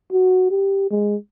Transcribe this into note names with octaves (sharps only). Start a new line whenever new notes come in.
F#4
G4
G#3